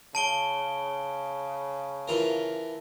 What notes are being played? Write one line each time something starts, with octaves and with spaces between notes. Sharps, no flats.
C#3 A5 D7 G7
E3 F4 A#4